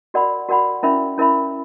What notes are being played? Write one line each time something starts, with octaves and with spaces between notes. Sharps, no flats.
F#4 A#4 D5 F#5 B5
F#4 A#4 D5 F#5 B5
C#4 E4 A#4 E5 B5
C#4 E4 A#4 E5 B5